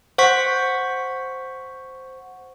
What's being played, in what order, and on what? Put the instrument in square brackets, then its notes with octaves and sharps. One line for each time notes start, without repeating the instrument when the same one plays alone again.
[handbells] C5 F#5 C#6 B6